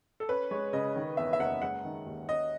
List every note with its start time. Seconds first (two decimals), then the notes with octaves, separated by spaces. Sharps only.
0.20 A4
0.29 C#4 B4
0.51 G#3 C#5
0.73 C#3 D#5
0.96 D#3
1.17 E2 E5
1.33 E5
1.39 F#1 F#5
1.62 G#3 F#5
1.85 D#3
2.06 D#2
2.29 C#4 D#5